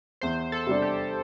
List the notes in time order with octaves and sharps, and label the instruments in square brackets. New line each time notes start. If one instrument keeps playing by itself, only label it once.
[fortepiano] E2 [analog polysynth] C5
[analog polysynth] A4
[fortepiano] C3 G3 D4
[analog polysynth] G4